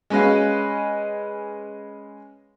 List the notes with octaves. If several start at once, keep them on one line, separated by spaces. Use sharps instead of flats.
G#3 C#4 B4 D#5 F5